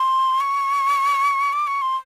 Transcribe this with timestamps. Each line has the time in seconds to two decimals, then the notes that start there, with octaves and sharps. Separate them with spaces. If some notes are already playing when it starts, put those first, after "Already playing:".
Already playing: C6
0.41 C#6
1.53 D6
1.67 C#6
1.82 C6